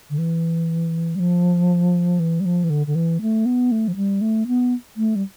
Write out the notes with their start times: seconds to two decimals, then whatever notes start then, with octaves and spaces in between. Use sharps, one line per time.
0.10 D3
0.18 E3
1.16 G3
1.20 F3
2.20 E3
2.40 G3
2.45 F3
2.64 E3
2.70 D3
2.87 D3
2.95 E3
3.21 A3
3.46 B3
3.72 A3
3.88 F3
3.96 G3
4.21 A3
4.47 B3
4.97 A3
5.16 G3